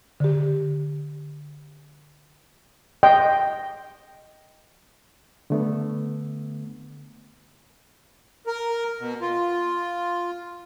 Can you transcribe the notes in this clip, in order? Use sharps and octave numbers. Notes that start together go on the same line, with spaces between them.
D3 G4
D#5 G5 C6
D3 A3 B3
A#4
B2
F4